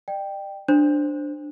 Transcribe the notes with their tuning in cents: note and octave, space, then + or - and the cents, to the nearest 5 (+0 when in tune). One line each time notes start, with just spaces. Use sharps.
D5 +40 G5 +0
D4 +5 C5 +0